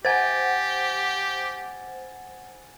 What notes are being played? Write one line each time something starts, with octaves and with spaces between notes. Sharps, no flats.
G4 C5 F#5 G#5 G#6 A6